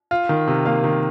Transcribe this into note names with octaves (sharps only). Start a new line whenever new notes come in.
F4
D#3
C3
A#3 F5
D#3